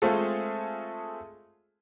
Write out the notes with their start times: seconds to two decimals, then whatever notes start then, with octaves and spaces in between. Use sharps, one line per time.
0.02 G#3 A3 C4 F4 G#4 A4